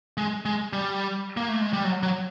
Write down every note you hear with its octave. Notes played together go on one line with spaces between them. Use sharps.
G#3
G#3
G3
A#3
A3
G#3
G3
F#3
F#3